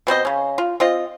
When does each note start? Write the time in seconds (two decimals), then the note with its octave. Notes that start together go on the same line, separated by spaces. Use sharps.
0.07 B2 C4 C5 D#5
0.25 C#3 C#4
0.58 F4
0.80 C4 F4 D#5